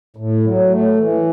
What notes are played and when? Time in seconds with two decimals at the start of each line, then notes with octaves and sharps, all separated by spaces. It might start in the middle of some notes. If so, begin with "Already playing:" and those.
0.16 A2
0.44 F#3
0.70 A3
0.97 E3